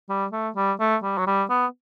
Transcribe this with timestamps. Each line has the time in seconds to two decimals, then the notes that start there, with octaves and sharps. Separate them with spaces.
0.09 G3
0.33 A3
0.56 G3
0.80 A3
1.03 G3
1.18 F#3
1.27 G3
1.50 B3